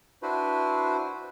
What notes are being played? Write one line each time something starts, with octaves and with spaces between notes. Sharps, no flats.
D4 E4 F#4 B4 C5